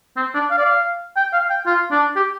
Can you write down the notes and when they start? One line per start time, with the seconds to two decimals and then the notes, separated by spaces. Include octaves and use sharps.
0.17 C4
0.34 D4
0.51 F5
0.58 D5
0.66 F5
1.17 G5
1.33 F5
1.50 G5
1.67 F4
1.91 D4
2.16 G4